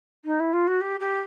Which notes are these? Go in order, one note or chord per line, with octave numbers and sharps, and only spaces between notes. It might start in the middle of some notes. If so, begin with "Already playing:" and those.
D#4
E4
F4
F#4
G4
G4